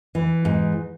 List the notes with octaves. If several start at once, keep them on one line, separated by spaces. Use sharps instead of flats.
E3
G#2